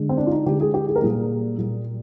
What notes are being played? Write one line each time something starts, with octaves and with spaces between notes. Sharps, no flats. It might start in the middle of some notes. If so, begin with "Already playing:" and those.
Already playing: D3 G#3
C4
D4
F4
D#4
D3 G#3 G4
G#4
G4
G#4
A#4
A#2 G3 A#3 G#4
A#2 G3 A#3